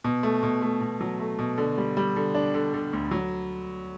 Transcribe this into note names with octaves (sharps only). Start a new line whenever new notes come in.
B2
A3
B2
A3
B2
F#3
A3
B2
D3
G3
G3
D3
D4
D3
D3
D2
F#3